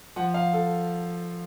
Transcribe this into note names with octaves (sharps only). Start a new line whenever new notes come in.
F3 F#5
F5
A4